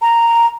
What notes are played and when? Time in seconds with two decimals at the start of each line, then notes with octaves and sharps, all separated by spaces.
0.02 A#5